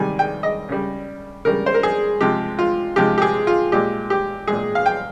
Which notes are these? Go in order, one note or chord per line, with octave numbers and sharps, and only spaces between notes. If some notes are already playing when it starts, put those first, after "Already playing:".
Already playing: C3 D#3 G3 G#5
G5
D#5
C#3 G3
C#3 G3 A#4
C5
A#4
G#4
C3 F3 G#3 G4
F4
C3 F3 G#3 G4
G4
G#4
F4
A#2 G#3 G4
G4
A#2 G#3 G#4
F5
G5